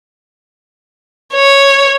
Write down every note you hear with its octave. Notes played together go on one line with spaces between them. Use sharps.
C#5